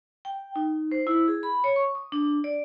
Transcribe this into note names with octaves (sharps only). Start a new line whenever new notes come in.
G5
D#4
C5
E4
G#4
B5
C#5
C#6
D#6
D4
D5